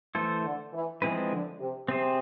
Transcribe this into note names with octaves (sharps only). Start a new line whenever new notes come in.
E3 A3 E4 A4 C5
D3
E3
E3 F3 G#3 C4 E4 B4
D3
C3
C3 C4 G#4 C5